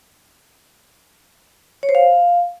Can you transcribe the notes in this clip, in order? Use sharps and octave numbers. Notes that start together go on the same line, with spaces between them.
C#5
C5
F5